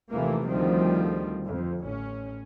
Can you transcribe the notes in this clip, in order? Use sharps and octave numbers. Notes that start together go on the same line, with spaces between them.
D#2 C3 E3 F3 A3 A#3
D2 D#3 F3 G3 C4
F2
A1 C#4